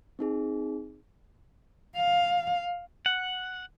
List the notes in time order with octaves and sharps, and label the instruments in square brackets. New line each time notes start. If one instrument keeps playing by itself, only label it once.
[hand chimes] C4 D#4 G#4
[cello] F5
[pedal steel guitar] F#5